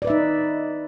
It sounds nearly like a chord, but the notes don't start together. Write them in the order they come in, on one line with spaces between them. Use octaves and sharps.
D5 B4 E5 D#4